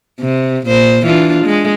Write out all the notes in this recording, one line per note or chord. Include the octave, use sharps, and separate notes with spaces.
C3
A#2 C5
E3 D4 F4
G#3